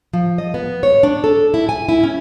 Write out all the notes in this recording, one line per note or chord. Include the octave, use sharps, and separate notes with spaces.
F3
D#5
B3
C#5
D4
A4
E4
G#5
E4
C#4